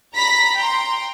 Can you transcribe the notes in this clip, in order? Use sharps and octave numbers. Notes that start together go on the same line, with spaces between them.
A#5 B5 A#6 B6
G5 A#5 C6